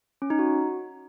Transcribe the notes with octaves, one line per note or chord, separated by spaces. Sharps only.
C#4
D#4
F#4